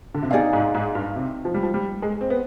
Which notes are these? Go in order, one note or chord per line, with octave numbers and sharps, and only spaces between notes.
D3
C3
B2 D#4 G#4 D5 F5
G#2
G#2
G2
C3
F3
G3
F3
G3
G#3
C4
B3